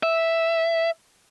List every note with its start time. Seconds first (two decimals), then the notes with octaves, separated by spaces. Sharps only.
0.03 E5